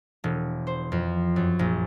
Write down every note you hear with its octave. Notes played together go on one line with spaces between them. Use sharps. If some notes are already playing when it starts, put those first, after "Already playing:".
E1
C5
F2
F#2
A#1